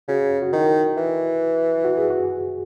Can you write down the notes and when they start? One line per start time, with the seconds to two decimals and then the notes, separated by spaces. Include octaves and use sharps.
0.08 C#3 F#4
0.42 F#4
0.53 D#3 E4
0.97 E3
1.85 F#4
1.98 G#4
2.10 F#4